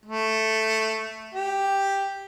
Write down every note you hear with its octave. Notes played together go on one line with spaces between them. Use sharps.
A3
G4